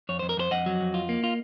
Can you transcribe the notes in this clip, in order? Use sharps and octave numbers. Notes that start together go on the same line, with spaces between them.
F2 C#5
F2 C5
A#4
F2 A4 C5
F2 D#5 F#5
F#3
F2
F4
A#3
F4